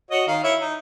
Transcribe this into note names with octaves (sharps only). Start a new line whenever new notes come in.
F#4 C#5 D#5
D#3 F5
E4 C#5 E5
D#4